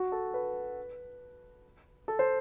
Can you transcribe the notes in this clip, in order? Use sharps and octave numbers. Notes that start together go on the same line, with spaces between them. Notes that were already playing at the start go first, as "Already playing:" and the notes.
Already playing: F#4
A4
B4
A4
C5